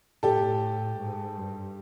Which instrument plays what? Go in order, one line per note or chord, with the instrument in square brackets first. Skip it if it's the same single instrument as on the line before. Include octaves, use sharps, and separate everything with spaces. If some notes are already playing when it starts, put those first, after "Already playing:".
[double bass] A2 [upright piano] G4 A4
[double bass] G#2
G2